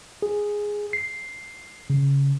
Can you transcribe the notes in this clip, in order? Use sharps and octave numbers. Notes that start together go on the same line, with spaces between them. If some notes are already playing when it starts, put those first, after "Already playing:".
G#4
C7
C#3